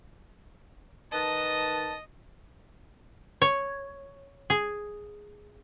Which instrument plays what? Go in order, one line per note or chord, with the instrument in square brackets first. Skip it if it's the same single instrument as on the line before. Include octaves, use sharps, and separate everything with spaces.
[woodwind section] D#3 B4 A5 [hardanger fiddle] D#5
[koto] C#5
G#4